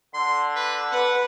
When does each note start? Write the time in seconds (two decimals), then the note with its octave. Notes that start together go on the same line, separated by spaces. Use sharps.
0.14 D3 C6
0.56 B4
0.91 B4 F#5